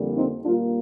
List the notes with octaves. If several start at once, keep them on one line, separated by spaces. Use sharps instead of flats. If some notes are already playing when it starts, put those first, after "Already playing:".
Already playing: F2 D3 G3 A#3
C4 D#4
A#2 G3 A#3 D4 F4